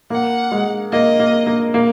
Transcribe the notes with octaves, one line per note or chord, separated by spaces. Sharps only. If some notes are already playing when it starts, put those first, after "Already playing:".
A#3 F#5
G#3
A#3 D#5
A#3
A#3
A#3